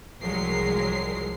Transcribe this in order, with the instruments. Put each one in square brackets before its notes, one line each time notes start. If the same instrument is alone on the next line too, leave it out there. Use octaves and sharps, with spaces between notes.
[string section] C2 F3 F#3 G#3 A#4 C7